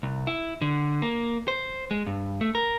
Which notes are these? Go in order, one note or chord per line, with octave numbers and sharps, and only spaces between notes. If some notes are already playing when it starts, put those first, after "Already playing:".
C2
E4
D3
A#3
C5
G#3
G2
A3
A#4